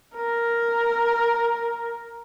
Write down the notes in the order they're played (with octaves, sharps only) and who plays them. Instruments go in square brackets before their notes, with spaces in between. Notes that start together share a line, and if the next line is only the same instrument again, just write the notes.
[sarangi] A#4